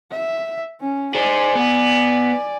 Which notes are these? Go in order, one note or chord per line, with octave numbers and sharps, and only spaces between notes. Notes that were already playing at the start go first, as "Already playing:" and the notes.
E5
C#4
G#4 C5 D5 G#5
B3